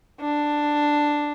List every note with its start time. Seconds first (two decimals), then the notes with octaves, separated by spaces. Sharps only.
0.21 D4